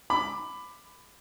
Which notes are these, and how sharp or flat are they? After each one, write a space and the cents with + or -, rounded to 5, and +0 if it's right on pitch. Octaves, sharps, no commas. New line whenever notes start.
B5 +15 D6 +10